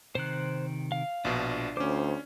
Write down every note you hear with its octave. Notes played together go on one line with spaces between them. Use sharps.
C3 D#3 C5 F#6
F5
A#1 B2 D4 F4
D2 C#4 C5 D6